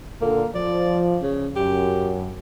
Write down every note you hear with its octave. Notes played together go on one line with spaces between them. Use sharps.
A#2 D3 A#3 A4
F3 D5
C#3
F#2 G4